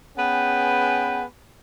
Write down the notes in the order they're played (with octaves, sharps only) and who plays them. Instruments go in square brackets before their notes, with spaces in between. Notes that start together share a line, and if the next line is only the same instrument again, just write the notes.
[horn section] B3 C#4 G#4 B4 G5 G#5